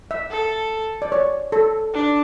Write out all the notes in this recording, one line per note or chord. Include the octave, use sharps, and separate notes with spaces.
E5
A4
D5
C#5
A4
D4